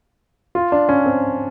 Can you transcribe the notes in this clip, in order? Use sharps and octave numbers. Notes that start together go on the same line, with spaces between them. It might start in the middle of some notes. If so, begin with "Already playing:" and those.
F4
D4
C#4
C4